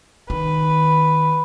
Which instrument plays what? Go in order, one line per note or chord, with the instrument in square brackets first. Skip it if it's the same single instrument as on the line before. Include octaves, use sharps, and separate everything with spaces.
[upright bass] D#3 [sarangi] B4